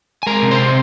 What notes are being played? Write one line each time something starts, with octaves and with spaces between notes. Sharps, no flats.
G#5
G#3 A#4 A#5
C3
C5 C6
C3